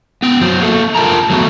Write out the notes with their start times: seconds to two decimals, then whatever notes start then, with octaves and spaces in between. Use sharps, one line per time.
0.22 B3 G5
0.41 F#3 C5
0.61 A#3 A4
0.95 F4 A#4 G5 A5 A#5
1.30 F#3 A3 B3 F#4